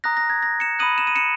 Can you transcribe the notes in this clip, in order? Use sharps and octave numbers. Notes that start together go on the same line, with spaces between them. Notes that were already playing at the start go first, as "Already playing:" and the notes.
A#5 D#6 F#6 A#6
A#6
G#6
A#6
C#7 E7
B5 D#6 F#6 D#7 F#7
E7
D#7
C#7 E7